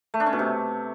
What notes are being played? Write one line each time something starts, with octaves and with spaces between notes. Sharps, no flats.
A3
D4
C#4
B2
C3